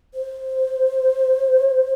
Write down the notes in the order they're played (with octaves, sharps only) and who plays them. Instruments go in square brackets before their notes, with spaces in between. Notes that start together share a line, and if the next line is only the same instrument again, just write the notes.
[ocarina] C5